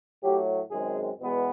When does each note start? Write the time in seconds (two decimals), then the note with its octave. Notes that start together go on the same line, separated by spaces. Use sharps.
0.22 A2 F#3 A3 G4
0.71 F#2 D#3 G#3 C4 G#4
1.19 E2 B2 G#3 B3